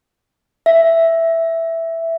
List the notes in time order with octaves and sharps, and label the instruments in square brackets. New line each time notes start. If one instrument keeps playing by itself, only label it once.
[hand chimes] E5